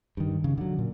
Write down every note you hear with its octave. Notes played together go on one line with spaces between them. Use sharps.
G2 D#3
C#3
D3 F#3
A#2